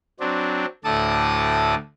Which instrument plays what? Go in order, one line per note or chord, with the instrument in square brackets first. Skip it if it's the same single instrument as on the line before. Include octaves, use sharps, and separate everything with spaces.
[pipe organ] F#3 C4 D4
D2 A2 A4 D5 A5 D#6